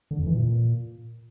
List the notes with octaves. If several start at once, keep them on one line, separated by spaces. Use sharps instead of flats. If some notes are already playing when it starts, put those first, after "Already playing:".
D3
F2
E3
A#2